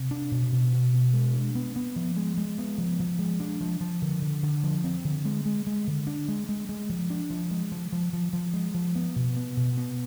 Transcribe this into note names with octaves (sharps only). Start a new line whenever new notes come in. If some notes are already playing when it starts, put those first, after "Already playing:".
Already playing: C3
D4
B2
B2
B2
B2
G#3
D4
B3
B3
F3
G#3
G#3
B3
F3
F3
G#3
D4
F3
F3
D3
D3
D3
F3
C4
D3
G#3
G#3
G#3
D3
D4
G#3
G#3
G#3
F3
D4
F3
G#3
F3
F3
F3
F3
G#3
F3
B3
B2
B3
B2
B3